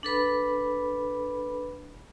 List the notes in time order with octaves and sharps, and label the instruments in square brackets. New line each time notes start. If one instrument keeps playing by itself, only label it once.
[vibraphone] D4 A4 B4 B5